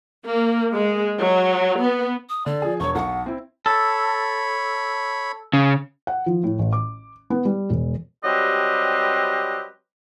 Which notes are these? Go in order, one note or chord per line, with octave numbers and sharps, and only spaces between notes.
A#3
G#3
F#3
B3
D#6
D3 D5
F3 G#4
E1 C#5 C#6
B1 F#5 C#6
C4 E4
A4 C#5 B5
C#3
F#5
F3
A2
A1
D6
B3
G3
E1
F#3 G3 C4 G4 B4 D#5